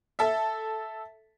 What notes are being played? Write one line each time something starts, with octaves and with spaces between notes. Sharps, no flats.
A4 E5